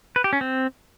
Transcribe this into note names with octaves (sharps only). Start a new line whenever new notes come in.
B4
G4
C#4
C4